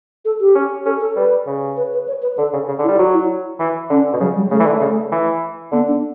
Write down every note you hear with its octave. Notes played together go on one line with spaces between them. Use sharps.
A4
G4
C#4
C#4 A4
A4
G3 B4
C#3
B4
B4
C#5
B4
D3 A4
C#3
C#3
D3
E4
G3
F#3 F#4
E4
E3
D3 C#4
B2
C#3 F#3
G3
C#3 A3
E3
D3
C#3
E3
D3 B3
D4